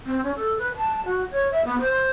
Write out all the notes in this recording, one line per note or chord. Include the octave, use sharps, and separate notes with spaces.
C4
C#4
A4
B4
A5
F#4
C#5
E5
B3
C5